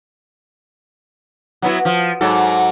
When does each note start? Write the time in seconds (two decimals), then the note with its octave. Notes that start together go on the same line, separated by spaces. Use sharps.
1.62 F#3 B3 E4
1.85 F3
2.21 G#2 F#3 A4